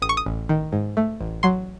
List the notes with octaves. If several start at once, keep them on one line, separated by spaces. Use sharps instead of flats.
A1 D#6
C#6
D#6
A1
D#3
G#2
A3
A1
F#3 C6